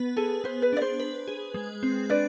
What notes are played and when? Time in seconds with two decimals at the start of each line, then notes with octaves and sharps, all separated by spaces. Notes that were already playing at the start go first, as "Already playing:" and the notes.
Already playing: B3 B4
0.16 G#4 A4
0.44 B3 C5
0.62 B4
0.73 D4 D5
0.82 C5
1.00 B4
1.27 G#4
1.54 G#3
1.83 C4
2.09 D4 B4 D5